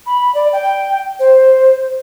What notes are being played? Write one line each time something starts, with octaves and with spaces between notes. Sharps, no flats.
B5
D5
G5
C5